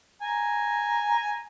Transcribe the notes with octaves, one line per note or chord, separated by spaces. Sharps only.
G#5 A#5